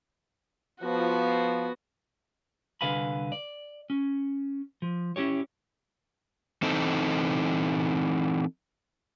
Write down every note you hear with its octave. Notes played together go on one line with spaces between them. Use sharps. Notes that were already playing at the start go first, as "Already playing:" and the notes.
F3 B3 F#4
C2 D3 B4 F5 G#5 B5
D5
C#4
F3
C#4 E4 G4 C#5
E3 C4 D#4 A4